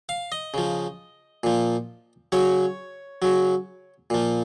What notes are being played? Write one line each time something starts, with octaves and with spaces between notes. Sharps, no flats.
F5
D#5
C#3 F3
A#2 F3
C#3 F#3 C#5
C#3 F#3
A#2 F3